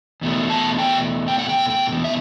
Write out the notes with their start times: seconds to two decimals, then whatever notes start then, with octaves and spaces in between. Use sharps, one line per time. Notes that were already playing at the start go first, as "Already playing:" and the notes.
0.21 E2 B2 A3
0.50 A5
0.78 G5
1.28 G5
1.39 F#5
1.49 G5
1.70 G5
1.92 E2 B2
2.04 E5